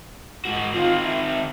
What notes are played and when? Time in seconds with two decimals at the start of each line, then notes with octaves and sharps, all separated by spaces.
0.45 G#2 F#4
0.74 D#3 C4 F4
1.05 E5